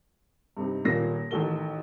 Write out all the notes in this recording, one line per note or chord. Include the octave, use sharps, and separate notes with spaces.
G2 C3 D#4
D#1 A#2 A#3 A#6
A1 D#3 F#4 A4 G7